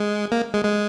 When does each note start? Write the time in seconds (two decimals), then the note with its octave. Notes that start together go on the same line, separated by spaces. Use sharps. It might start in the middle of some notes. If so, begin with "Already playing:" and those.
Already playing: G#3
0.32 A#3
0.54 G#3
0.65 G#3